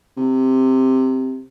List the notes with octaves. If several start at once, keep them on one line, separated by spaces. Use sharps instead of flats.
C3